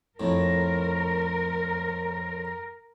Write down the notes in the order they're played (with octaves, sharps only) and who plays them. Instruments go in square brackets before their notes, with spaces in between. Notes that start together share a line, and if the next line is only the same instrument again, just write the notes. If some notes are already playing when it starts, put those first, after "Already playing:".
[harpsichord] F2 A2 [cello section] A#4